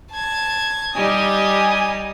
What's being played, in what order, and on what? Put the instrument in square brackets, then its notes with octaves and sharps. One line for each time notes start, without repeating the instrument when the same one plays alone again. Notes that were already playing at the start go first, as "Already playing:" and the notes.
[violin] A5 G#6
[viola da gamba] G3 D#4 G4 [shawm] G#5 [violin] D#6